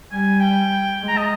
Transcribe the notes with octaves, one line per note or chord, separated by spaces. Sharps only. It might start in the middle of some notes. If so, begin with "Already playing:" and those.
G3 G#5
G5
G#3
A#5
D#5